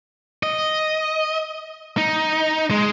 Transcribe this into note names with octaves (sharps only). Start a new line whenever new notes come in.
D#5
D#4
G#3